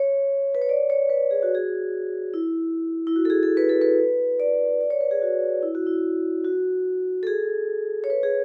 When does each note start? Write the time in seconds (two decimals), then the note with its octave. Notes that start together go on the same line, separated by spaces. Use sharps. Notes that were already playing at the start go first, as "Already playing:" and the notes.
Already playing: C#5
0.55 B4
0.62 C#5
0.69 D5
0.90 C#5
1.10 B4
1.31 G#4
1.43 F#4
1.55 G#4
2.34 E4
3.07 E4
3.16 F#4
3.25 A4
3.30 G#4
3.43 A4
3.57 B4
3.69 A4
3.82 B4
4.40 D5
4.81 D5
4.90 C#5
5.01 B4
5.11 G#4
5.22 F#4
5.63 E4
5.75 F#4
5.87 E4
6.45 F#4
7.23 A4
7.27 G#4
8.04 C#5
8.10 B4
8.23 G#4